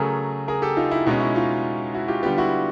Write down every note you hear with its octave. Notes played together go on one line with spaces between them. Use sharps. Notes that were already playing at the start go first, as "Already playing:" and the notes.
Already playing: C#3 F#3 A3 G#4 A#4
G#4 A#4
G4 A4
D#4 F4
E4
B2 G#3 C#4 D#4
E4
D#4 F4
E4 F#4
F4 G4
D3 G3 B3 F4 G4
E4 F#4